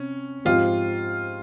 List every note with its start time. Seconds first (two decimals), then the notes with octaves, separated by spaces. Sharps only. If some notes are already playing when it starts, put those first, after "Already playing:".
Already playing: C3 C#4
0.45 G#2 F3 C4 F4 G4